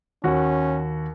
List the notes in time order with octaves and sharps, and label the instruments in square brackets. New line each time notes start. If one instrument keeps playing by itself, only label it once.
[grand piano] D#2 F#4 [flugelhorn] C#4